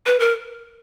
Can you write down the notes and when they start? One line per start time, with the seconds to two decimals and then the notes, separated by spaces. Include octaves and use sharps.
0.06 B4
0.20 A#4